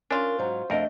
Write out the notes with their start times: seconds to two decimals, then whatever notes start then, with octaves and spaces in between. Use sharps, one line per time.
0.11 C#4 D4 F4 A#4
0.38 G#2 F#3 C5 A#5
0.70 F2 A3 D4 A#4 D#5